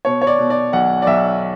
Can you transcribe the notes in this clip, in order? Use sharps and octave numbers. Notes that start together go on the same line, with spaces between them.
B2 C#5
C#5
D5
B2
D5
B1 F#5
D5
B1 E5